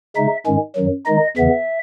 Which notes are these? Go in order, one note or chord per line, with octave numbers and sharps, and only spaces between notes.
C#3 G#3 D#4 E5
G#2 D#3 G#3 C#4
F#2 D#3 F#3
D#3 G#3 D#4 D#5
E2 C#3 E3 B3 E5